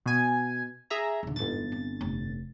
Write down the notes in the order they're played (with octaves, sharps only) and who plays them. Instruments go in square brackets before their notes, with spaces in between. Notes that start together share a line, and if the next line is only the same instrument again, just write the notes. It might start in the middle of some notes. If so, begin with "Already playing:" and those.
[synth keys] B2 G#5
G#4 E5 A#5
[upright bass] D#1 D3
[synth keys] G1 A6 [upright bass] F2 G#2
[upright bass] C4
F1